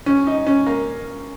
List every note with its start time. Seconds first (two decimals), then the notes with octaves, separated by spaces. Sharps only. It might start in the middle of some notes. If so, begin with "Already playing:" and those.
0.06 C#4
0.27 D#4
0.46 C#4
0.66 A#3